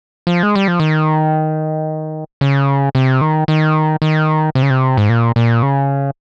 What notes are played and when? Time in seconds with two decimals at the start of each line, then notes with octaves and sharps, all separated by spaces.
0.27 F3
0.43 G#3
0.56 G3
0.68 F3
0.80 D#3
2.41 C#3
2.95 C3
3.21 D#3
3.48 D#3
4.02 D#3
4.55 C3
4.63 C#3
4.70 C3
4.97 G#2
5.09 A#2
5.36 A#2
5.63 C#3